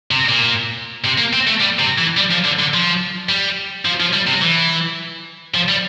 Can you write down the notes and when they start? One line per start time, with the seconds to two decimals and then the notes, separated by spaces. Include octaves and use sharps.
0.11 C3
0.29 A#2
1.05 C3
1.18 A#3
1.33 C4
1.47 A3
1.61 G3
1.79 C3
1.98 E3
2.17 G3
2.31 F3
2.44 D3
2.59 D3
2.74 F3
3.29 G3
3.85 F3
4.00 F3
4.13 G3
4.27 C3
4.42 E3
5.55 F3
5.69 G3